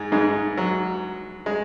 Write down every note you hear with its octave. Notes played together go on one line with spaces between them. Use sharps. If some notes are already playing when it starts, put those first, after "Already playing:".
Already playing: G#2 G#3
G#2 G#3
F#3
G#3